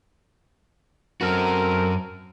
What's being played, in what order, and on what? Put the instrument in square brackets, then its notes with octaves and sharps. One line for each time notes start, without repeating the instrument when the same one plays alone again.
[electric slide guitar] F#2 C#4 F#4 [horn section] C4 A4 A#4